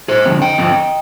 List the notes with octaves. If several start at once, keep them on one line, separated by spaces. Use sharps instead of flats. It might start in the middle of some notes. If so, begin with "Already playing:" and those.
G#4 C5
D3 F3 C4
D#5 G5
D3 F3 C4